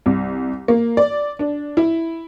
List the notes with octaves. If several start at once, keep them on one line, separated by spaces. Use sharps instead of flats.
C2
A#3
D5
D4
E4